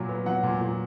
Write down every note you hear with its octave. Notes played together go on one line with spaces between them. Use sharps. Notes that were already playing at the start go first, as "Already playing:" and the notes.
Already playing: A#2 F#3
B3
F#3 F#5
A#2
A#2